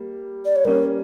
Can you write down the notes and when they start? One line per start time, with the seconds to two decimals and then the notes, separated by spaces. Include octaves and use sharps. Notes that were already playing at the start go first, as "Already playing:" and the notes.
Already playing: G3 A#3
0.45 D5
0.56 C#5
0.65 G3 A#3 C#4 A#4